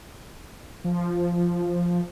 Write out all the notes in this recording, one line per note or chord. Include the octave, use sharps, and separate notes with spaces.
F3